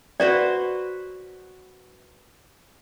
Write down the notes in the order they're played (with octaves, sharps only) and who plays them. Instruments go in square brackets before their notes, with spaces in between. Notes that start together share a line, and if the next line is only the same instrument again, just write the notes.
[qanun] F#4 B4 C5 [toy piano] D5